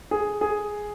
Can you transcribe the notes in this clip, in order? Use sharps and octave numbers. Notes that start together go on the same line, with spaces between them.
G#4
G#4